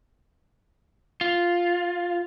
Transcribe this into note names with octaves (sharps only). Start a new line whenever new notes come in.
F4